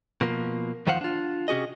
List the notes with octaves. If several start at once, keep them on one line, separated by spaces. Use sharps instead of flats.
B2 F3 A#3
E2 D#3 F3 C5 F5 F#5
D4 F4
C3 C#4 F#4 G#4 D#5